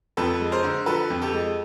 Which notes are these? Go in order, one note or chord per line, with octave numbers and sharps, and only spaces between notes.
F2 A4 B4
G#3
A#4 C5
D3
F3 A4 B4
F2
G4 A4
G#3